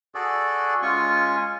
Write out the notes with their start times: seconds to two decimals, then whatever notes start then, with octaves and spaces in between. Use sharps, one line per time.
0.15 F#4 G#4 A4 D5
0.82 G#3 C#4 F4 G#5 C#6